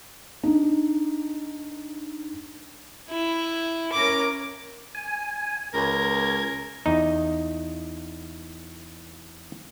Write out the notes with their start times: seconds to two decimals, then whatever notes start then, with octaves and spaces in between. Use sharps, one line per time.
0.43 D4 D#4
3.09 E4
3.92 C#4 A#4 D6
4.95 G#5
5.74 C#2 A#4 G#6
6.86 E2 D#4